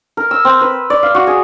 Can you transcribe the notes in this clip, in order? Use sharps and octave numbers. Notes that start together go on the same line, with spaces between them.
A#4
E6
C4
B4
D5
F5
F#4
G#4